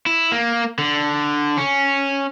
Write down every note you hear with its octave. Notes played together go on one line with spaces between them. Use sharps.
E4
A#3
D3
C#4